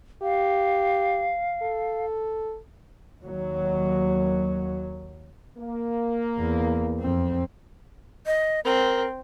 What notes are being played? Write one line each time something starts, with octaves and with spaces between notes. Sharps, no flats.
G4 F5
A4
D#2 F#3
A#3
E2
F2 C4
D#5
C4 A#4